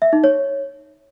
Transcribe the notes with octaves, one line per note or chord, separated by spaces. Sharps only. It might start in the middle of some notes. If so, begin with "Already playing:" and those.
E5
D#4
C#5